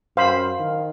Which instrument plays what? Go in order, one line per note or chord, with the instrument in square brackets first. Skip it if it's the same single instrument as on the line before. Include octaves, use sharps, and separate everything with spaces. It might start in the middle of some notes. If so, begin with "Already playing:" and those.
[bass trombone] F#2 [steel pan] C5 B5 [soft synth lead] F5
[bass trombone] D#3